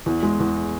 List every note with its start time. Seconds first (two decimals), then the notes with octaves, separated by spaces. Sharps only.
0.06 E2
0.23 G#3
0.40 E2